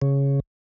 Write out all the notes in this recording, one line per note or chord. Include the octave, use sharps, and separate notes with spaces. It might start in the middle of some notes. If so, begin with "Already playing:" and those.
C#3